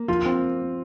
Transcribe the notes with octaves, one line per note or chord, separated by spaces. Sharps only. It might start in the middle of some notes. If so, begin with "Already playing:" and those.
Already playing: A#3
F3 F4
C4